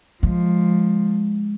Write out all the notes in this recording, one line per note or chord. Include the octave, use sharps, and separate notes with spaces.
F3 G#3